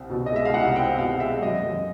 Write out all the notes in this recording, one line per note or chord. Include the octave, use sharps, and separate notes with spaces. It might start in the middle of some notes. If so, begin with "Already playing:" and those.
Already playing: C2 C4
B2
D#5
G#3 E5
F5
C2 F#5
C4 G5
B2 F5
G#3 E5
E5
F#2 D#5
F#2